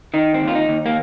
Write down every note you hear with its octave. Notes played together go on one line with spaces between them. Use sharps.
D#3 D#4
C4
D#2
F4
D#4
D#2
A#3